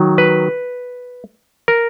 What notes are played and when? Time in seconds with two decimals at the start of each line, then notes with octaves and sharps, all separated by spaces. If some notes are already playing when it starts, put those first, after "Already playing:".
Already playing: D#3 F#3
0.18 B4
1.68 A#4